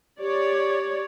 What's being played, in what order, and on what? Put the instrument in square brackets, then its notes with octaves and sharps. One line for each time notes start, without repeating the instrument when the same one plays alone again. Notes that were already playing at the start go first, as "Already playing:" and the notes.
[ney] G4 [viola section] C#5 D5